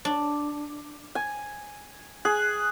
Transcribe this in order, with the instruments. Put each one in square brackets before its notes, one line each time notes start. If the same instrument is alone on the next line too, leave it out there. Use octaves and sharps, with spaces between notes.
[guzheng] D4
[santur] G#5
[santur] G#4 [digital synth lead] F#6